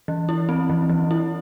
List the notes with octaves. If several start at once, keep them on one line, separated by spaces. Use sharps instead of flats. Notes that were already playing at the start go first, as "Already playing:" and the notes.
E3
E4
C4
E3
E3
E4